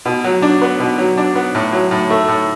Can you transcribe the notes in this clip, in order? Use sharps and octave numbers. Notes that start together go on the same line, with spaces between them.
B2
F#3
D4
B3
B2
F#3
D4
B3
A2
F#3
A2
A3
A2